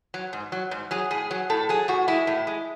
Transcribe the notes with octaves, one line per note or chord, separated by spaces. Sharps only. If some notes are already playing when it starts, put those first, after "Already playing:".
F#3
G#2
F#3
G#2
F#3 G#4
A2 G#4
F#3
A2 A4
F#3 G#4
A2 F#4
G#3 E4
A2
G#3